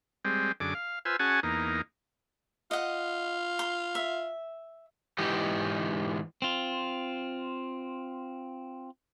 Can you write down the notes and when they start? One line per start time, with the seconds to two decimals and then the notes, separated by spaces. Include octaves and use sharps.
0.25 G3 G#3 C4
0.60 F#2 D3 G#4 D6
0.75 F5
1.05 F4 B4 C5 G#5 E6
1.19 C#4 F#4 G#4 F#5 G#5 A5
1.43 E2 A#3 D#4
2.71 F4 D#5 F#5
3.59 C6
3.95 E5
5.18 G#2 E3 G4 D#5
6.42 C4 F4